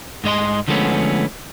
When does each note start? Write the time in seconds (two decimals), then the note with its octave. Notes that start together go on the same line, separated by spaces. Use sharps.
0.24 G#2 G#3 D#5 C6
0.68 D3 F3 G#3 A3 B3 C#4